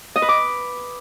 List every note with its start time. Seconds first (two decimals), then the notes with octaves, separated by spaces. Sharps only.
0.16 D#5
0.22 B4
0.29 D6